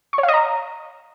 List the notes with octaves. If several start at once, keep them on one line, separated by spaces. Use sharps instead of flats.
C#6
C#5
F5
D#5
A#5